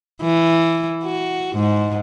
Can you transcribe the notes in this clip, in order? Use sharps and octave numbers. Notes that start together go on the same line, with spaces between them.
E3
F#4
G#2